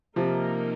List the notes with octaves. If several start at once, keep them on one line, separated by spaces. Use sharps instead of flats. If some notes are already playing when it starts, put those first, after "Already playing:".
C3 F3 A#3 D#4 A#4